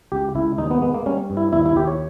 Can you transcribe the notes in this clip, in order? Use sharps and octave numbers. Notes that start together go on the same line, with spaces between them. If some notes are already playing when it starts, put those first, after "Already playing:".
C#2 G4
C#2 E4
D#2 D#4
B3
G#3 B3
A#3
G3 C#4
G2
E4
D#2 E4
E4
D#2 G4
C#5